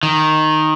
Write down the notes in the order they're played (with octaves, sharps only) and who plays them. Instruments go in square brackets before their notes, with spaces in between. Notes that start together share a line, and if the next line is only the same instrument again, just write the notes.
[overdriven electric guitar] D#3